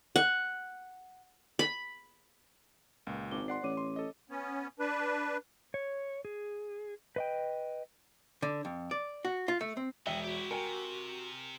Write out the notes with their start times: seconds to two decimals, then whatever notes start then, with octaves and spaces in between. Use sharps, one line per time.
0.16 F#5
1.59 B5
3.07 C#2 A#2
3.31 G#1 D6 G7
3.48 D5 F#5 C6 C7
3.63 A1 C#5 D6 D#7
3.77 C6
3.96 A4 D#5
4.30 B3 C#4
4.79 D4 B4
5.74 C#5
6.25 G#4
7.16 B4 D#5 G5
8.42 D3
8.65 F2
8.91 D5
9.25 F#4
9.48 F4
9.61 A3
9.77 C4
10.06 E1 F#4 G#4 E5 G5 G7
10.24 E4 F#4 G4
10.51 C3 A#4 G5 G#5